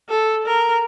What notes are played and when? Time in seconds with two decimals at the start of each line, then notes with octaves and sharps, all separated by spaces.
0.09 A4
0.46 A#4